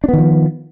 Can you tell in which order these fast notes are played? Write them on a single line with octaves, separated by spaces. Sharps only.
D4 B3 D#3 F3